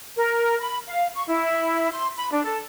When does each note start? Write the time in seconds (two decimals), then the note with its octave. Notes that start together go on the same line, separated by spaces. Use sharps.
0.17 A#4
0.60 B5
0.87 F5
1.15 C#6
1.28 E4
1.90 C6
2.17 B5
2.32 D4
2.44 A4